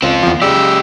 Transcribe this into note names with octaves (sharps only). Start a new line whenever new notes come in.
C#2 C4 F4
E2 F3
C#3 G#3 G4 D5 E6